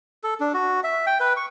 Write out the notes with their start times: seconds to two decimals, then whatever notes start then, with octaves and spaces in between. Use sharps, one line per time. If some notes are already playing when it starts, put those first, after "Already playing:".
0.24 A4
0.40 D4
0.54 F#4
0.84 E5
1.07 G5
1.20 B4
1.37 C#6